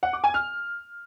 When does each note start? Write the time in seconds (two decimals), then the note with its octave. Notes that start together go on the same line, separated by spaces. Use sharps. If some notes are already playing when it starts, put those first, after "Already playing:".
0.03 F#5
0.13 D6
0.24 G#5
0.34 F6